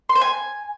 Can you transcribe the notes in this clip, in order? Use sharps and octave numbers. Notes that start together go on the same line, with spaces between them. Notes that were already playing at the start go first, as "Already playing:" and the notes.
C6
C5
G#5